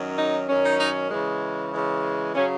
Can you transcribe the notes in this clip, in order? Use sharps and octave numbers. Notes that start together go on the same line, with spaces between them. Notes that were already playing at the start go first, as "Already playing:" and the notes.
Already playing: F#2 D#3 F#3 C#4
D#4
F#2 D#3 F#3 C#4
D#4
D#4
C#3 E3 G#3
C#3 E3 G#3
C#3 F#3 C#4